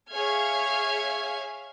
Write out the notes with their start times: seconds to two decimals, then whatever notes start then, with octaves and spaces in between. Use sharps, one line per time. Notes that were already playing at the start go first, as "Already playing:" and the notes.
0.13 G#4 C#5 E5 F5 F6 G#6